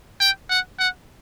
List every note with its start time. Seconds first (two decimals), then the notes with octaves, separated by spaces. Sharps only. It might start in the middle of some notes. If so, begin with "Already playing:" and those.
0.21 G5
0.50 F#5
0.79 F#5